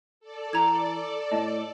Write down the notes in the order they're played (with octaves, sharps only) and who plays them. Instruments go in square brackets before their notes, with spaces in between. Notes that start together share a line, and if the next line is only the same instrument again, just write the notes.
[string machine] A4 D5
[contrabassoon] E3 [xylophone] A#5 G#6
[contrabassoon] A2 [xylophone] D#5 A5